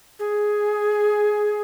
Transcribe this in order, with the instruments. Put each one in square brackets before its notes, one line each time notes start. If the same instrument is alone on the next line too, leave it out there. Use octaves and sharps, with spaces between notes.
[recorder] G#4